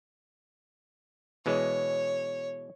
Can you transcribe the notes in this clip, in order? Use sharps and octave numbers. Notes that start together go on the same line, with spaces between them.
B2 E3 G#3 C#5